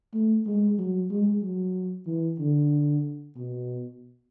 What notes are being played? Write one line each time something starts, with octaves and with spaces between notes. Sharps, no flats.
A3
G#3
F#3
G#3
F#3
E3
D3
B2